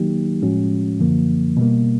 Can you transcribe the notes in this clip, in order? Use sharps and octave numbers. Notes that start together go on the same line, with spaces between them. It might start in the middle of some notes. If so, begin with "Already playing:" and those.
Already playing: D#3 F#3 A#3 D#4 G4
A2 F3 G#3 C#4 F#4
F#2 D3 F3 A#3
B2 G3 A#3